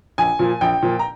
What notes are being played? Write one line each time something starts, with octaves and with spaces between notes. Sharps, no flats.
A#1 G#5
A#2 F3
A#1 G5
A#2 F3
A#5